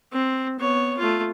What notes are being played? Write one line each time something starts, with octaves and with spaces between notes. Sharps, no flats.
C4
B3 C#5
A3 F4